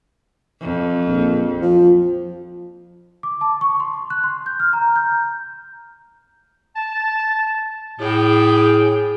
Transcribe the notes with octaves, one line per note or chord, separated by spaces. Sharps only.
F2
A#1
F3
D6
A5
C#6
C6
F#6
C6
G6
F6
A#5
G6
A5
A2 G#4 G5